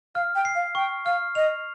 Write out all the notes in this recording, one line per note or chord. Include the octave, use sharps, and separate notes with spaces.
F5 F6
G5
C7
F5
G5 C#6
F5 F6
D#5 F7